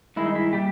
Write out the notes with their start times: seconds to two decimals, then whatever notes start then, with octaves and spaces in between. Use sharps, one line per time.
0.16 G2 D#3 G#3 E4
0.26 D#4
0.35 E4
0.52 A#2 G3 G4